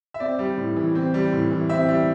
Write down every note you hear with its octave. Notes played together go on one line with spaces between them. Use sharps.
E5
C4 D5
G3
A2
E3
C4
G3
A2
E3
C4 E5
G3